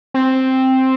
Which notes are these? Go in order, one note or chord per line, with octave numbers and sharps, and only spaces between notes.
C4